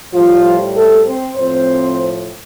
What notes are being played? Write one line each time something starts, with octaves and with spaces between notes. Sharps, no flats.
A2 F3 G3 F4
A3 A4
C4 C5
A2 F3 C4 C5